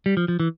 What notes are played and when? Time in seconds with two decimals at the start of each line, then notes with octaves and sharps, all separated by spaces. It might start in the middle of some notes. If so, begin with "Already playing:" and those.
0.06 G3
0.17 F3
0.28 F3
0.40 E3